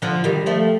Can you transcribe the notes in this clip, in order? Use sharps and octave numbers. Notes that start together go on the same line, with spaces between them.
D3 F3
D#3 G3
F3 A3